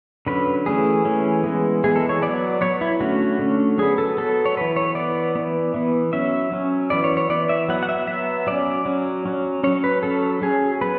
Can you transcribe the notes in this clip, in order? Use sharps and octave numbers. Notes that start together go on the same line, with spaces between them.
D3 F#3 C#4 B4
E3 A3 C#4 G#4
E3 A3 C#4
E3 G#3 B3
E3 G#3 B3 G#4
A4
C#5
F#3 B3 D5
F#3 B3 C#5
E4
D3 A3 C#4 F#4
D3 A3 C#4
F#3 B3 G#4
A4
F#3 B3 A4
C#5
E3 B3 B4
C#5
E3 B3 D5
E3 B3
E3 B3
F#3 C#4 E5
F#3 C#4
E3 B3 D5
C#5
C#5
E3 B3 D5
E5
F#3 B3 F#5
F#5
E5
F#3 B3 E5
F#3 C#4 D5
F#3 C#4
F#3 C#4
F#3 C#4 C#5
B4
F#3 C#4 A4
F#3 C#4 G#4
B3 B4